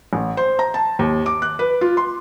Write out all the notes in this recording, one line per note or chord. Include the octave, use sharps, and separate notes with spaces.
A1
C5
A#5
A5
D#2
D6
F#6
B4
F4
C6